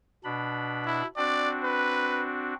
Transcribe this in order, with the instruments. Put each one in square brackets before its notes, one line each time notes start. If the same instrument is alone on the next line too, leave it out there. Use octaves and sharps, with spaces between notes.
[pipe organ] B2 D4 B5
[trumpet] E4
[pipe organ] C4 D4 F#4 [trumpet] D5
[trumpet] B4